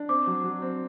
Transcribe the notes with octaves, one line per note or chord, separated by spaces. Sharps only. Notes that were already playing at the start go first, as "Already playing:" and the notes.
Already playing: D4
C4 D6
F#3
F#3
C4